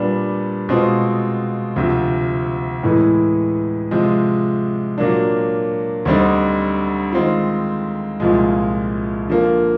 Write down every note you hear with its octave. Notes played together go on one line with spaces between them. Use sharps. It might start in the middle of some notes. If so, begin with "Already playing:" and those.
Already playing: A#2 G3 B3 D4
B2 G#3 C4 F4
D2 C3 F3
A2 E3 G#3 B3
C3 F3 G#3
A#2 F#3 A#3 D4
D2 D3 G3 C4 D#4
D#3 G#3 C4 F4
C2 A#2 F3 G#3
D3 F3 A#3